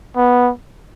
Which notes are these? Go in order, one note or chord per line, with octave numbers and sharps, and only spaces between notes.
B3